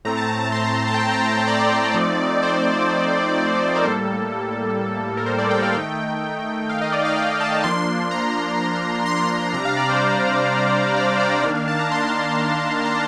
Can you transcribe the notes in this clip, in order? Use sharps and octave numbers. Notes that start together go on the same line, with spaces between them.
A2 A3 C4 A#5
A5
A5
A5
C6
A#5
A5
G5
A5
A#5
G5
A5
D5
F3 A3 C4 D#4
C5
A#4
A2 G3 A#3 A4
A#4
C5
D5
G5
F5
D#3 A3 D#4 G5
F5
D#5
D5
F5
G5
A5
F3 A#3 D4 C6
C6
A#5
C6
C6
C3 G3 D4 A#5
F5
D5
C5
D5
C5
D5
D#3 A#3 D4 F5
F5
A5
A#5
C6
A#5